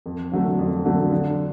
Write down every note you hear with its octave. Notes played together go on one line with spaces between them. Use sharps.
F2
D3 F#3 A3
F2
D3 F#3 A3
D3